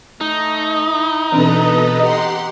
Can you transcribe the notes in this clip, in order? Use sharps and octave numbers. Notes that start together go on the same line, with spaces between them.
A3 D#4
E4
B2 E3 C4 D4 A4 B4 A#5
G4 D#5 F#5 C6